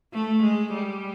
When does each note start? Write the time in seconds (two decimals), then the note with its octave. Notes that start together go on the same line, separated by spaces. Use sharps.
0.14 A3
0.43 G#3
0.73 G3